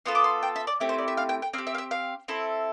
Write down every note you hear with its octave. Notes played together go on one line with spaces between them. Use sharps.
B3 F4 A4 C6
D6
C6
G5
E5
D5
A3 C4 E4 G4
C5
D5
E5
F5
G5
G5
C4 G4 F5
E5
F5
E5
F5
C4 E4 A4